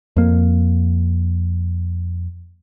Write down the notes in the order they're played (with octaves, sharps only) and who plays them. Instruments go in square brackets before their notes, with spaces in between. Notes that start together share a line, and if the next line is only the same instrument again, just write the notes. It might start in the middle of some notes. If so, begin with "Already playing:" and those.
[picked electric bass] F2 A#3